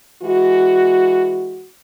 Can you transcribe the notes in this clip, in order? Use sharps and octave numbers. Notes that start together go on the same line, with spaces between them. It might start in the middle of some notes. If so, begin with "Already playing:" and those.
E3 G#3 F#4